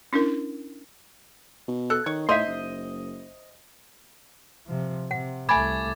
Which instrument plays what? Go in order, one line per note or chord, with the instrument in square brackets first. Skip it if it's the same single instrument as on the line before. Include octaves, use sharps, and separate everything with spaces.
[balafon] C#4 D4 E4 A#4
[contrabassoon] B2
[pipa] A4 [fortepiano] F#6
[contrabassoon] D#3 [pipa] C#5
[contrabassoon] A2 [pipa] D#4 C6 [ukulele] C5 E5 [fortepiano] D#5
[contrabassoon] F#1
[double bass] C3 F3
[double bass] C3 [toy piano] F#5
[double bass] C2 A3 [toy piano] G#5 B5 [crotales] D6 G#6 A6